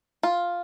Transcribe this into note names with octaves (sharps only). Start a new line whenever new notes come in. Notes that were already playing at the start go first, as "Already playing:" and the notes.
F4